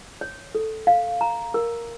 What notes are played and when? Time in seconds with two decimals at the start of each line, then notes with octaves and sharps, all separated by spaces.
0.21 C#5
0.55 A4
0.87 F5
1.21 A#5
1.54 A#4